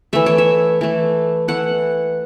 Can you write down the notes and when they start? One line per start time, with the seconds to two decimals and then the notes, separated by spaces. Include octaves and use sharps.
0.13 E3 A3 E5
0.26 C#5
0.38 E5
0.81 E3 A3
1.48 E3 A3 F#5